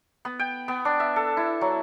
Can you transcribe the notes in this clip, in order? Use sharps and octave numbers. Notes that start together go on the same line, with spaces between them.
B3
G5
B3
D4
E5
A4
E4
F#3